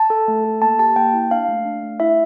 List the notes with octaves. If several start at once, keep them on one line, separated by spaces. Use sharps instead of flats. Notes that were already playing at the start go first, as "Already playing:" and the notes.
Already playing: A5
A4
A3
A4
A#3 A5
G4 A5
A#3 G5
E4
D4 F5
A3
D4
A3
E4 E5